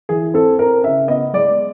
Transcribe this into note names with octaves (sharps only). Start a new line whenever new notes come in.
E3 G#4
C4 A4
C4 A#4
C#3 E5
B3 D#5
G#3 D5